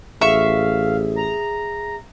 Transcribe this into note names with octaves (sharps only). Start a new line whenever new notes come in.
A1 G#4 E5 F5 C#6
A#5